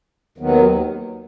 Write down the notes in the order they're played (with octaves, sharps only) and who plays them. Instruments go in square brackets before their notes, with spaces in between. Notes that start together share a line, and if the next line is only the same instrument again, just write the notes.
[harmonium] D#2 D#3 F#3 B3